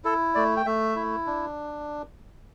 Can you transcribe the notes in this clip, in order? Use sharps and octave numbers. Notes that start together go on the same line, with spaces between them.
E4 A4
A3 D5
G5
A3 E5
E4
D4